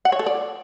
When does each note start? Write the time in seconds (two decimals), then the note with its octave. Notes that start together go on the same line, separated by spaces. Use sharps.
0.05 F#5
0.12 C#5
0.19 A4
0.26 D5